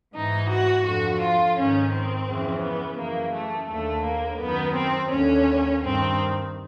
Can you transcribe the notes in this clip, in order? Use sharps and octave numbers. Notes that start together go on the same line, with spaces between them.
G#2 E3 D#4
F#4
F2 D3 F#4
F4
G#2 D#3 C#4
C4
F2 C#3 E3
B3
F#2 C#3 E3 A#3
A3
D#2 D3 A3
A#3
F#2 D#3 B3
C4
D#2 D3 C#4
G2 D#3 C4